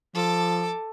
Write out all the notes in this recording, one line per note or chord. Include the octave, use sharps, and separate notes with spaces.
F3 A4 D6